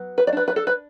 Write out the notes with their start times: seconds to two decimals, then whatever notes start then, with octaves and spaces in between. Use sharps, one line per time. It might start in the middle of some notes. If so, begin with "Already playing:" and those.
Already playing: F#3 B3
0.18 B4
0.27 D5
0.33 D4 B4
0.48 B4
0.56 A4
0.67 B4